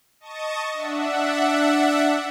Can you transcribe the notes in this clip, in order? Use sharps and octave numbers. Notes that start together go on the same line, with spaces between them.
D#5 A5 C#6 D#6
D4 E5 F#5